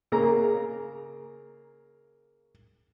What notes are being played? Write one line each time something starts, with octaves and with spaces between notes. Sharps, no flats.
C#3 A#3 A#5